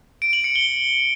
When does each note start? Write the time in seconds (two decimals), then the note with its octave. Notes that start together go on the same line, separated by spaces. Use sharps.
0.22 D7
0.33 F#7
0.44 C#7
0.56 G7